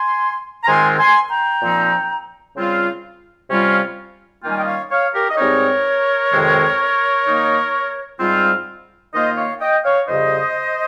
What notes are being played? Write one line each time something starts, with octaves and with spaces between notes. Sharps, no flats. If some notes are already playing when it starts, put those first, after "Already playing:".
Already playing: G#5 C6
A#5
G#2 D#3 G#3 C4 F4 G#5 C6
G#5 C6
G5 A#5
A#2 F3 C4 D#4
C#3 G3 C4 F4
C3 G3 C#4 F4
D#3 G3 A#3 C#4 F4 G5
G#5
D#5 G5
C#5 F5
C#5 F5
G4 A#4
D#5
G#2 G3 C4 D#4 A#4 C#5
F2 C3 D#3 G#3
D#3 A#3 D#4
G#2 G3 C4 F4
D#3 A#3 F4 C5 D#5
C#5 F5
D#5 G5
C#5 F5
F2 C#3 G3 C5 D#5